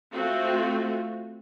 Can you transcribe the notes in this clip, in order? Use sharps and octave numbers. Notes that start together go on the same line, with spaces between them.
A3 C4 F4 F#4